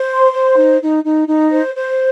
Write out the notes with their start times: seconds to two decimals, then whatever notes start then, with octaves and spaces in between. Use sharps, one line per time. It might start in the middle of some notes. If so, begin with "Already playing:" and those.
Already playing: C5
0.10 C6
0.33 C5
0.57 D#4
0.81 D#4
1.04 D#4
1.28 D#4
1.52 C5
1.75 C5